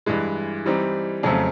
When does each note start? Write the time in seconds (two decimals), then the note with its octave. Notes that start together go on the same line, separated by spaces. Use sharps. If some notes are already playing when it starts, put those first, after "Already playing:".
0.06 G2 E3 G#3
0.66 E3 G3 C4 D#4
1.23 F2 C#3 F#3 A3 C4